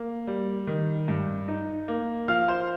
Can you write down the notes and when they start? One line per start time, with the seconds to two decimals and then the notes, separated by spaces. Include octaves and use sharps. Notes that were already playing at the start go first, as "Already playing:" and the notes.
Already playing: A#3
0.27 G3
0.67 D#3
1.08 G2
1.48 D#4
1.88 A#3
2.28 F3 F5 F6
2.48 C5 C6